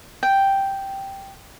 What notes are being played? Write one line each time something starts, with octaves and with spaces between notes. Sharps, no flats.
G5